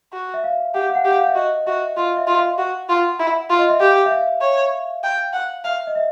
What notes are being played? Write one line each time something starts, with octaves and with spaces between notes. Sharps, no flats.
F#4
E5
F5
G4 F#5
F5
F#5
G4
F#5
F5
E5
F#4 D#5
F#4 E5
F4 F5
E5
F4
F5
F#4 F#5
F4
E4
F4
D#5
E5
G4 F5
E5
F5
C#5
G5
F#5
E5 F5
D#5
E5